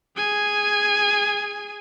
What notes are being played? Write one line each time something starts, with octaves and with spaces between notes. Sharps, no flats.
G#4 G#5